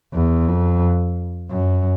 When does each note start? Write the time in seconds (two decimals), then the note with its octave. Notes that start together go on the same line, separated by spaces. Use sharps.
0.14 E2
0.47 F2
1.50 F#2